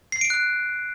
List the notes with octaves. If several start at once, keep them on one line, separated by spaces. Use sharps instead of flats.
C7
D7
F#6